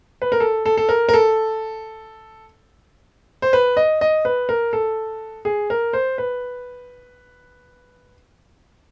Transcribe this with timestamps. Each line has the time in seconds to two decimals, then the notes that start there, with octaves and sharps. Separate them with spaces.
0.22 B4
0.32 A#4
0.40 A4
0.66 A4
0.78 A4
0.89 A#4
1.09 A#4
1.14 A4
3.42 C5
3.53 B4
3.77 D#5
4.01 D#5
4.25 B4
4.49 A#4
4.73 A4
5.45 G#4
5.70 A#4
5.93 C5
6.18 B4